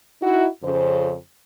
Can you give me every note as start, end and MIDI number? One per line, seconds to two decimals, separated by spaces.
0.22 0.47 63
0.22 0.47 64
0.22 0.47 66
0.64 1.14 41
0.64 1.14 49
0.64 1.14 72